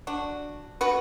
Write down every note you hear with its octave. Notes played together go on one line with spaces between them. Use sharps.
D4 F#4
F#4 B4